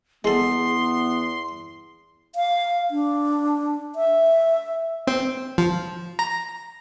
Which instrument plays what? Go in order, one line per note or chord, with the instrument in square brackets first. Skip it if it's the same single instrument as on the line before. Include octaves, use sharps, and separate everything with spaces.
[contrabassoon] E2 [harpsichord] G#3 A4 [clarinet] B3 [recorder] C6
[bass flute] F5
D4
E5
[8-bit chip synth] C4
F3
A#5